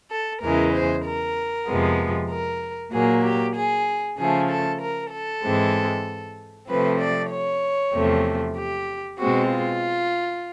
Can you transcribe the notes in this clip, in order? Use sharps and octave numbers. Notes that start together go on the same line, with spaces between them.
A4
E2 C#3 E3 G#3 A#4
C5
A#4
F2 C3 F3 G#3 B3
A#4
A#2 F#3 A#3 G#4
G4
G#4
C#3 F3 A3 G#4
A4
A#4
A4
G#2 E3 G#3 C4
C3 F3 A3 C4 B4
D5
C#5
E2 C3 F3 A3 C4
G4
B2 G#3 C4 F#4
F4